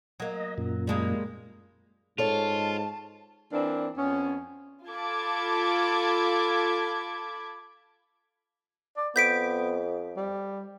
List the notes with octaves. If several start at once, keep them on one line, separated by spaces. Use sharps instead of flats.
F#3 A#3 D#5
F#2 A#2
G3 G#3 A#3
G#2 F4 A4 C#5 A5
E3 A#3 C4 D4
F2 B3 C#4
F4 A4 A5 B5 D6 G#6
D5
F2 B3 G6 B6 D7
G3